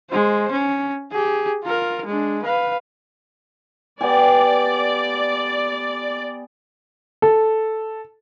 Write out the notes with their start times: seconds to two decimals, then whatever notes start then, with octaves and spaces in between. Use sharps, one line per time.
0.10 G#3 C5
0.52 C#4
1.11 G4 G#4
1.64 F4 A#4
2.05 G#3 D4
2.43 B4 F5
4.01 B3 G4 D5 G#5
7.22 A4